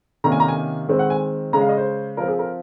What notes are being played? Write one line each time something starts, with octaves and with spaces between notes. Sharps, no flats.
C3 D#3 A#3 C#4 A#5
G#5
A#5
G#5
D#3 G#3 C4
F#5
G#5
C#3 G#3 C#4 A#5
F5
D#5
C5
F3 C4 A#4
G#4
A#4